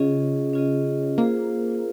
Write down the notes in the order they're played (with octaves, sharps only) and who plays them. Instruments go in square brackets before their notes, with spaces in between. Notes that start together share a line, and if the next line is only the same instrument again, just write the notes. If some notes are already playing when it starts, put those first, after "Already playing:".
Already playing: [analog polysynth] C#3 [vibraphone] C#4 F4 G#4 D#5
[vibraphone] C#4 F4 G#4 D#5
[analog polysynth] A#3 [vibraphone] F4 G#4 C5